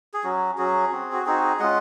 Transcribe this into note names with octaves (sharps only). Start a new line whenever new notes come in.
G#4
F#3 C#4 F#4
F#3 C#4 F#4 G#4
C4 F#4
F#4
C4 D#4 F#4 G#4
G#4
G#3 C#4 F4 D#5 F#5